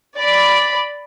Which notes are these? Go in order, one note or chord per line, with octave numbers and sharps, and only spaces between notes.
D5 B5